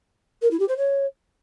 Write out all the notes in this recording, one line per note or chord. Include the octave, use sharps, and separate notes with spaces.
A#4
E4
G4
C5
C#5